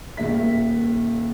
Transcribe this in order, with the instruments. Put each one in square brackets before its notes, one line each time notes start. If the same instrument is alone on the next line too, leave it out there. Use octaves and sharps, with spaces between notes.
[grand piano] D#1 D#2 G#4 E5 B6